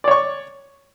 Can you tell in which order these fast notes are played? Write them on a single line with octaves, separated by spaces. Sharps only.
D5 C#5 C#6